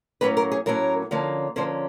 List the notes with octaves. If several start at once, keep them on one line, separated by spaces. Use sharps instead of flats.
A2 F#3 A#3 C#4 B4
A#4
G#4
A2 F#3 A#3 C#4 A#4
D3 F3 A#3 C#4
D3 F3 A#3 C#4 C5